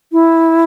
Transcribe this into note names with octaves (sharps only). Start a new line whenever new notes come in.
E4